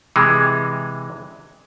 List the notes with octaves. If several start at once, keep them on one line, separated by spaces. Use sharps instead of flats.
C3 E3 G#3